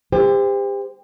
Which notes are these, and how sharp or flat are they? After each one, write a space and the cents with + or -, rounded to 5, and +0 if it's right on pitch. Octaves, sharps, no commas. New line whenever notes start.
G4 +35 C5 -25